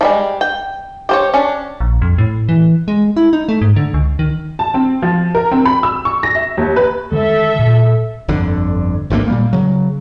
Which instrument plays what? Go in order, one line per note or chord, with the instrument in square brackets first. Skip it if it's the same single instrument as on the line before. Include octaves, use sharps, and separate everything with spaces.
[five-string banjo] F3 G3 G#3
G5
G4 C5 C#5
C#4 D4
[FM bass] A#1
F2
A2
E3
G#3
E4
D#4
A3
G#2
D3
C#2
D#3
[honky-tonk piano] A5
C4
F3
A#4
C4
B5
E6
C#6
A#6
E5
D#2
B4
[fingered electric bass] D3 D#3 G#3 [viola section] A4 E5
[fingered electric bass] A#2
[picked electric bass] G1 F2 D3
G#1 D2 A3 A#3
A#2 G3 A#3
C#3 F#3